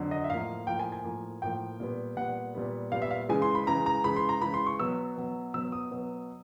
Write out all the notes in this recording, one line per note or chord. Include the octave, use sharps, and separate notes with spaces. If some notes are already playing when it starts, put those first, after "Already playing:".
Already playing: F2 D3 F#3
D#5
E5
A2 F3 A#3 F5
A2 F3 A#3 G5
G#5
G#5
A2 F3 A#3
A2 F3 A#3 G5
A#2 G3 B3
A#2 G3 B3 F#5
A#2 G3 B3
A#2 G3 B3 F5
E5
F5
C#3 E3 G#3 G#5
C6
B5
C#3 E3 G#3 A#5
A#5
C#3 E3 G#3 B5
C6
A#5
C#3 E3 G#3 B5
C6
C#6
B2 F#3 B3 E6
B2 F#3 B3
B2 F#3 B3 E6
D#6
B2 F#3 B3